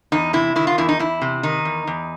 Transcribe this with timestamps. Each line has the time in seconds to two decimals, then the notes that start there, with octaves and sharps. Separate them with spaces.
0.12 E2 D#4
0.33 C3 E4
0.56 D#3 E4
0.67 F4
0.78 E2 E4
0.89 D#4
0.99 E2 E4
1.22 C3
1.43 D#3 D#4
1.65 E2
1.87 E2